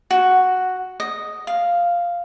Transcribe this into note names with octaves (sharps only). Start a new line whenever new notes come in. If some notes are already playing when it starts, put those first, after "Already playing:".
F#4
D#5
F5